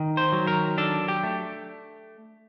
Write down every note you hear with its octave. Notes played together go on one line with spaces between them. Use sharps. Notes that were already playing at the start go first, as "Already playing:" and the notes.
Already playing: D#3
C5
F#3
A#4
D4 A4
G4
A3